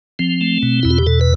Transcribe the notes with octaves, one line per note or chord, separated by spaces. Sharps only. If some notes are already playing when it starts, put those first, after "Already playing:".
F3 C4
A3
B2
E2 E4
F4
G4
B2 A4
B4